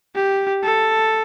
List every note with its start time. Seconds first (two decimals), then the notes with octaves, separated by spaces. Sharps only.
0.15 G4
0.64 A4